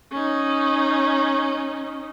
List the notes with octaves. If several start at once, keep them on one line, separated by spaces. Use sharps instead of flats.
C#4 D#4